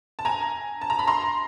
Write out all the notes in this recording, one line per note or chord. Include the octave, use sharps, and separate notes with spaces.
A5
G#5 A#5
A5
A#5
B5
A#5 C6